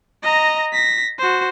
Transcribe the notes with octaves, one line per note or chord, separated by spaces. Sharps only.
D#5 A#5
A#6 B6
F#4 C5